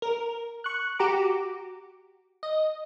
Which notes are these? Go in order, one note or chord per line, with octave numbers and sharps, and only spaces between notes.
A#4
C#6 F#6
F#4 G4 A#5 D6
D#5